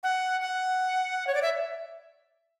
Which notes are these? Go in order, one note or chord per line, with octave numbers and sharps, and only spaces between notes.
F#5
F#5
C#5
D5
E5